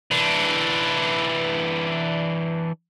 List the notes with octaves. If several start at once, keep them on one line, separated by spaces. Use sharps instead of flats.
E3 D4